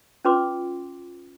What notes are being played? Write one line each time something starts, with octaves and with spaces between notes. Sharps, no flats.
C#4 F4 B4 C6 D6